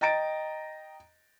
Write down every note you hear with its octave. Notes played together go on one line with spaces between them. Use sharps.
D#5 G5 A#5 A6 D7